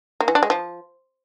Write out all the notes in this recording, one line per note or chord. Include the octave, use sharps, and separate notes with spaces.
A#3
E3
D4
G#3
F3